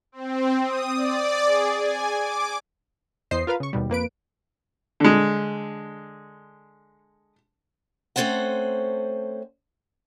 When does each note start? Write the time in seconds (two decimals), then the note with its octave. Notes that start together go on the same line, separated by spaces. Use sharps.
0.12 C4
0.63 D#6
0.94 D5
1.44 G#4
1.77 G#5
2.11 D6
3.31 E2 C5 D#5 C7
3.47 F4 A#4 B4 F5
3.60 C#3 C#6
3.73 D#2 B2 G3
3.90 F2 A#3 B4 D7
5.00 D3 G#3
8.16 A3 C4 C#4 A4 C5 F#5